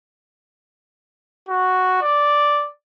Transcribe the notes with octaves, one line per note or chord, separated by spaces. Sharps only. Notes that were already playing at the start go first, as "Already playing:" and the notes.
F#4
D5